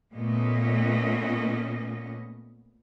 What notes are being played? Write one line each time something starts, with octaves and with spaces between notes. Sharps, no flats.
A#2 A3 B3 C#4 D#5